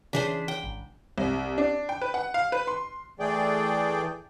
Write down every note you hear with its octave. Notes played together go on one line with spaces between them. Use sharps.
C#3 E3 D4 G#4 C5 B6
G5
G#1
C2
D4
G5
B4
F#5
F5
B4
C6
E3 A3 G#4 D5 G5